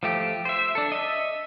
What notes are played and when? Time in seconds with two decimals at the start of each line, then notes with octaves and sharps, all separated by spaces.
0.03 F3 A3 G4
0.45 C5 E5
0.75 D4 A4
0.92 D#5 E5